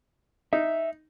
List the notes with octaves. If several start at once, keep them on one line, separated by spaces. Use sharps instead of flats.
D#4 E5